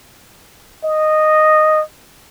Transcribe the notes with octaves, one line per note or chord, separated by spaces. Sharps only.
D#5